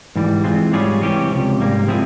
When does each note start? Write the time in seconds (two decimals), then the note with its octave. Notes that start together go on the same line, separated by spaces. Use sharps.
0.16 G#2 E3 G3
0.44 E3 G#3 C4 F4
0.73 G#2 G3 C#4 F4 G#4
1.02 C3 E3 G3 C#4 G4
1.30 C#2 C3 F3
1.59 G#2 G3 A#3
1.87 C3 F3 C4 E4 G#4